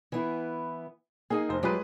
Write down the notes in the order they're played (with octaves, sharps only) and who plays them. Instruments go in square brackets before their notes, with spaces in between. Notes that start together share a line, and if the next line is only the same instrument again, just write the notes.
[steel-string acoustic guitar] E3 B3 E4
[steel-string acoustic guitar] A#3 D#4 G#5 [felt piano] G#4
[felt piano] F1 C5
[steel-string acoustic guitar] F#3 F4 G4 [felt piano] G#3 G#4 B4